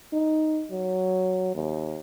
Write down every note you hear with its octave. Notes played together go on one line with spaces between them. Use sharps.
D#4
F#3
D#2